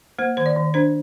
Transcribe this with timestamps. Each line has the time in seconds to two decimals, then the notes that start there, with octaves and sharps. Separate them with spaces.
0.19 A#3 C5
0.37 D#3 C5
0.46 D5
0.56 D#3
0.74 D4 C5